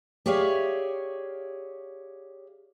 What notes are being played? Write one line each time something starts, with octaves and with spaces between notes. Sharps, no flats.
G4 G#4 C#5 D5 E5 F5